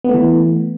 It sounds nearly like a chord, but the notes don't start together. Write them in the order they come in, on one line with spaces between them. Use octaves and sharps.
B3 A3 E3